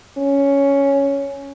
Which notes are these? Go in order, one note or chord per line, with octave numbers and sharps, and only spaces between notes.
C#4